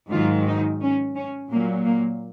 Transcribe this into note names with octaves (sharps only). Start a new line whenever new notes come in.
G#2 D#3 F#3 F4
D#4
C#4
C#4
A#2 F#3 A#3
A#3